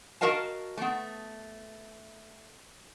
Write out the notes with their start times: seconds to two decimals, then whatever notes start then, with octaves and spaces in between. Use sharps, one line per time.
0.21 F#4 A#4 D#5 F5 A5
0.77 A3 B3